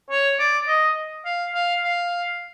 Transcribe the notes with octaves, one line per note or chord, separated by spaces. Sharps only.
C#5
D5
D#5
F5
F5
F5